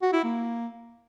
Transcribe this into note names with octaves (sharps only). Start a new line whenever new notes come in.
F#4
E4
A#3